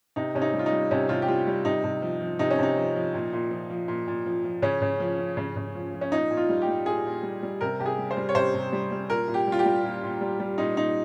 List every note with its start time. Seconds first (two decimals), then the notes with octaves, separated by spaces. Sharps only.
0.16 C3 D#4
0.35 C3 C#4
0.42 D#4
0.53 G3
0.59 F4
0.66 D#4
0.72 G3
0.91 C3 C#4
1.09 C3 F4
1.22 G4
1.28 G3 F4
1.47 G3
1.65 C3 D#4
1.84 C3
2.02 F3
2.21 F3
2.39 C3 D#4
2.51 C#4
2.59 C3 D#4
2.77 F3
2.96 F3
3.14 A#2
3.33 A#2
3.51 F3
3.70 F3
3.88 A#2
4.07 A#2
4.26 F3
4.44 F3
4.62 C#3 C#4
4.82 C#3
5.00 F3
5.19 F3
5.37 C#3
5.56 C#3
5.75 F3
5.94 F3
6.01 C#4
6.12 A#2 D#4
6.31 A#2
6.37 F4
6.49 G3
6.62 G4
6.68 G3
6.86 A#2 G#4
7.05 A#2
7.23 G3
7.43 G3
7.61 C3 A#4
7.80 C3 G4
7.86 G#4
7.98 G3
8.11 C5
8.17 G3
8.29 C#5
8.35 C3 C5
8.54 C3
8.73 G3
8.91 G3
9.10 A#2 A#4
9.28 A#2
9.34 G4
9.47 G3
9.52 F4
9.59 G4
9.65 G3
9.85 A#2
10.03 A#2
10.21 G3
10.40 G3
10.58 A#2 D#4
10.77 A#2 D#4